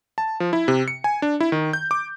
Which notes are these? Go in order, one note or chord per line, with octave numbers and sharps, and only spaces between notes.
A5
F3
E4
C3
C#7
G#5
D4
E4
D#3
G6
D6